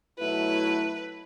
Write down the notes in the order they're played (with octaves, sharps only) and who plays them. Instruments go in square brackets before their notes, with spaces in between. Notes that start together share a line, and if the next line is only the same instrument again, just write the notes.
[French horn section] B2 F#3 A3 E4 [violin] B4